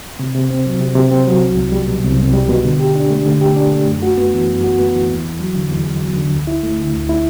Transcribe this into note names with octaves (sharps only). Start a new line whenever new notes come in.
C3
C3
C4
F#3
C3
C3
C4
F#3
C2
C2
G3
B2
C2
C2
G3
B2
D3
G4
D4
A3
D3
G4
D4
A3
F#2
F#4
B3
E3
F#2
F#4
B3
E3
E2
E2
F#3
D3
E2
E2
F#3
D3
D2
E4
A3
D3
D2
E4